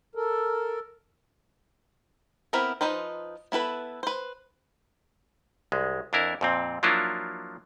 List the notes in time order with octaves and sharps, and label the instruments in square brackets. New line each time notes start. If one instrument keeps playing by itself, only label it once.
[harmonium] A4 A#4
[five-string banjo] B3 C4 E4 A#4 B5
F3 D#4 B4 C5
B3 E4 A4 B4
B4 C5
[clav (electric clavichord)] C2 G#3
F2 D4 E4 A#4
F2 A#2 C4
F3 F#3 A#3 D4 E4 F4